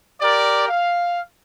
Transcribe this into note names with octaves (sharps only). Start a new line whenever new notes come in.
G4 A#4 D5
F5